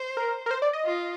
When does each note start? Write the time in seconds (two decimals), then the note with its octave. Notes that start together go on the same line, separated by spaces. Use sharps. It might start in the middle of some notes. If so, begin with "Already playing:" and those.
Already playing: C5
0.17 A#4
0.46 A#4
0.51 C5
0.62 D5
0.73 D#5
0.85 F4